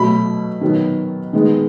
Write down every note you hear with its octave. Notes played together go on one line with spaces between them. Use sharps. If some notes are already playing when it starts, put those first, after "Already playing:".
Already playing: B2 F#3 A3 B5
D#3 F#3 B3
D#3 G#3 B3